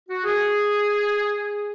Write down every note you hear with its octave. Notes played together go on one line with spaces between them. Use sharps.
F#4
G#4